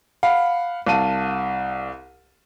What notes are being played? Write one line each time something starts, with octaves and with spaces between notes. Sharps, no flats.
F5 F#5 B5
C2 F5 A5 D#7